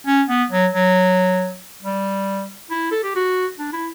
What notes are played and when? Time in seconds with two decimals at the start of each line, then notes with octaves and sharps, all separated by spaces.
0.07 C#4
0.28 B3
0.51 F#3
0.73 F#3
1.83 G3
2.71 E4
2.92 A4
3.03 G4
3.15 F#4
3.59 D4
3.73 E4